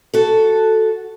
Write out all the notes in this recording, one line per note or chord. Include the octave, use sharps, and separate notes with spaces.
F#4 A4